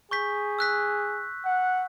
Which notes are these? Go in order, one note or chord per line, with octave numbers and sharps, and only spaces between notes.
G#4 C#6 G6 B6
E6 F#6 B6
F#5